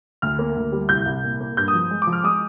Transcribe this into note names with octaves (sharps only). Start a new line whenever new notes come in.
D2 F6
A#3
D2
G3
C2 G6
C2
A#2
A#3
G2 G6
D#6
F3
G#3
D6
F3
F6
G#3 D#6